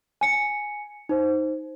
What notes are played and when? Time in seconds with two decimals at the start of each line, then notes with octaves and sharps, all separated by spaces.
0.21 G#5 C#7
1.09 D#4 C5